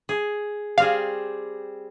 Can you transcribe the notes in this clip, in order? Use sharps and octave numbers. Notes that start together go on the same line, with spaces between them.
G#4
G3 C4 G#4 F5